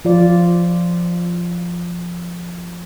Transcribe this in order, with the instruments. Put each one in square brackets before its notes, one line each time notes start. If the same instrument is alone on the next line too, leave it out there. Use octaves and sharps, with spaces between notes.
[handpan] F3 F4 D5